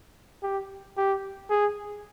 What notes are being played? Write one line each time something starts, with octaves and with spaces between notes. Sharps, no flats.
G4
G4
G#4